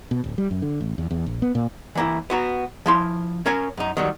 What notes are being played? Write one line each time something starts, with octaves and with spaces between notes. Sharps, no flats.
B2
D1
G3
F#2
D3
A1
E2
E2
A#1
B3
A#2
E3 A#3 E4
B3 F#4 A#5
F3 E4 C6
C#4 A#4 C#5 G#5
F#2 D#4
D#3 F#3 G3